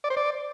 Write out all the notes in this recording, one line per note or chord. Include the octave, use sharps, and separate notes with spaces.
D5
C5
D5